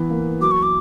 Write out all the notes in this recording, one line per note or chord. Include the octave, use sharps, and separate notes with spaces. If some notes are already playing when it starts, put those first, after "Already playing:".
Already playing: E3 B3
A#3
F#3 D6
C#6
D6